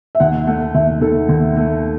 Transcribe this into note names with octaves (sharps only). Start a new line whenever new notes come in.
E5
D#2 F#5
A3 F#5
D#2 E5
D#3 A4
D#2
A3